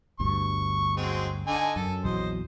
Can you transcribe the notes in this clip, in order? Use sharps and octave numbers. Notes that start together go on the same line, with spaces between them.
G1 D2 G2 C#6
F#3 G#3 C4
D3 D#4 G#5
F#2 A4
A#1 E2 F#3 C5 D#5